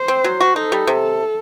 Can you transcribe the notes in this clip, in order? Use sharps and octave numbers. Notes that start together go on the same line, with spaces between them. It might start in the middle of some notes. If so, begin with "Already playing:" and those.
Already playing: C5
C4
F#3
F#4
D#4 A4
G3
C3